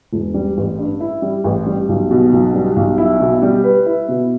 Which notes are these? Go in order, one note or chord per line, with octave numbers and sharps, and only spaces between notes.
E1
G3
A1
G2
E4
G3
A1
G3
B1
B2
B1
G3
B1
E4
B2
G3
B4
E4
B2